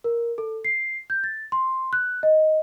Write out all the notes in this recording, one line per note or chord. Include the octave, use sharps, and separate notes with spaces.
A#4
A4
C7
G6
A6
C6
F#6
D#5